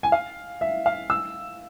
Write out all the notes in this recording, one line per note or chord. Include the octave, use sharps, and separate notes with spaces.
G#5
F5
E5
F5
E6